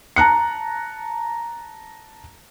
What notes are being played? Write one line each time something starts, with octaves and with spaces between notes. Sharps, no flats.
A5 A#5 F#6 C#7